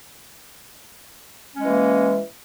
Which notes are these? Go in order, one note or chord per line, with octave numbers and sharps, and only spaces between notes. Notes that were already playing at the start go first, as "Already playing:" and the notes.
E3 G#3 A#3 C#4